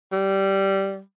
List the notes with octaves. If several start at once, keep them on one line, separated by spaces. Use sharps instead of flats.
G3